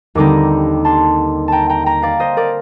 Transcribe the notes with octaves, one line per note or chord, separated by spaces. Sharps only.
D#2 D3 G3 C4 D#4 A#5 D6
A5 C6
G5 A5 A#5
G5 A#5
G5 A#5
D5 F5
C5 D#5
A#4 D5